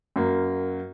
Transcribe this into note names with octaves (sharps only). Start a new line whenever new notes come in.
F#2 A#3